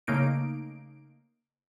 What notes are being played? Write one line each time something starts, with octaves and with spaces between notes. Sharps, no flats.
C#3 A3 A#3 D#4 D7